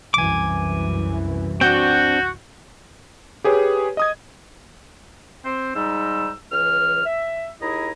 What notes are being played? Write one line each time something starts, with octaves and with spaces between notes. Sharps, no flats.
C2 F#2 E3 G#5 D6
C4 D4 F#4 G6
G4 G#4 B4 C#5
D#5 D#6 G#6
C4 C5
G#2 G3 D#4 E6
C#2 E3 F6
E5
D#2 E4 G#4 D#5 A#5